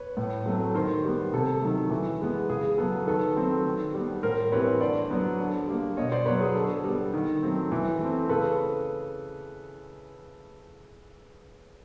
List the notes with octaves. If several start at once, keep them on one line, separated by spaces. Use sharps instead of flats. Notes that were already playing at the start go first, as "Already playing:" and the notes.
Already playing: B4 C#5
A2
F#3 A3 C4
D#3 A#4 C5
G3 B3
C3 A4
D#3 F#3 A3
E3
G#3 B3
C#3 G#4
F#3 B3 A4
D#3 A4 B4
F#3 A3 C4
D#3
G3 B3
A2 A#4 C5
E3 G3 C4 B4 C#5
D3 C5 D5
F#3 B3
D3
G3 A#3
B2 C#5 D#5
C5 D5
F#3 B3 B4 C#5
G#4
D3 A4
G3 B3
D#3
F#3 A3 C4
E3
A3 C4
C#3 A4 B4